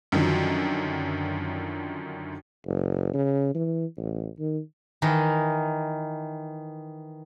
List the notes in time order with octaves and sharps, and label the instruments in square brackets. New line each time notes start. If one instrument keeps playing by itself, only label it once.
[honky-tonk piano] F#2 D3 D#3 F3 F#3
[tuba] F#1
C#3
E3
A1
D#3
[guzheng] D#3 E3 D#4